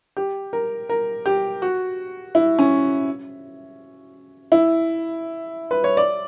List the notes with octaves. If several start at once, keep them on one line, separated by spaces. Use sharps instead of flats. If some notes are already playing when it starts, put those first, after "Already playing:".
G4
A#4
A#4
G4
F#4
E4
C#4
E4
B4
C#5
D5